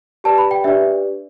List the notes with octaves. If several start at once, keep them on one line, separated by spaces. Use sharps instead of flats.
G4 B4 D5 A5
B5
G5
D4 G4 B4 D5 E5